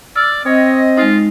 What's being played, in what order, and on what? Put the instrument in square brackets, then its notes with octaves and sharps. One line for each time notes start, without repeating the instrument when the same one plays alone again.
[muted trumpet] D5 [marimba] E6 F6
[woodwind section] C4 D#5 [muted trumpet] C#5
[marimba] G#3 D#4 [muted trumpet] F4